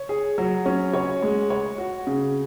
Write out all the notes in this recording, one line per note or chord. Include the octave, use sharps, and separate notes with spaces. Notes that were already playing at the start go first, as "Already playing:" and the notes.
Already playing: C#5
G#4
F#3
C#4
C#5
G#3
C#5
F#4
C#3